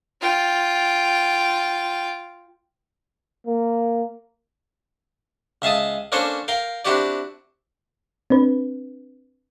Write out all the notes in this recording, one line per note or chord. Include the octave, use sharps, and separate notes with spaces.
F4 G5
A#3
C#2 E5 F5 A5 D#6
A#3 C#4 D4 A4 C5 C#5
A#4 F5 G5
C4 D4 E4 F#4 G4 D5
C4 D4 B4